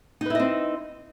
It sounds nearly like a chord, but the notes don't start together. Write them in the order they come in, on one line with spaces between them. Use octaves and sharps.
D#4 B4 E4 D#5 C4